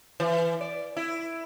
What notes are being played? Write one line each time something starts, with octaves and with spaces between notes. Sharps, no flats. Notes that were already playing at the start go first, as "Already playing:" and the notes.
E3
D5
E4